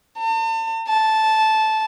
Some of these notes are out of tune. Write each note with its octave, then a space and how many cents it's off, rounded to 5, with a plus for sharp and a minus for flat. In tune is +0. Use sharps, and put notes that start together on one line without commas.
A5 +40
A5 -10